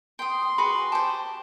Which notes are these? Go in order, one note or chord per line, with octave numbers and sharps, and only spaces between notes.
G5 C6 D#6
F#4 G#4 B4 B5
G4 C5 A5